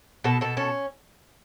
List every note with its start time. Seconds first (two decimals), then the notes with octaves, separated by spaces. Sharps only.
0.24 B2 A4
0.41 B2 A4
0.57 C#4 A4